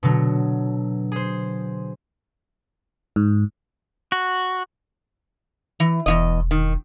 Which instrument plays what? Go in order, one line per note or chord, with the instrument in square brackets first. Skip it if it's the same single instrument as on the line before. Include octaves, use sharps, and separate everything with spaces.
[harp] B2 D3 F#3
G#4 C5
[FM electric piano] G#2
[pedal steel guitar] F#4
[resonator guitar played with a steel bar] E3
[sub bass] E1 [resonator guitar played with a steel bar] E2 C#3 D#5
[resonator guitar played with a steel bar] D#3